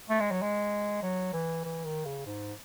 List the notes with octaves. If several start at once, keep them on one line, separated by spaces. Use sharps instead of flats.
A3
G#3
F#3
G#3
F#3
E3
E3
D#3
C#3
G#2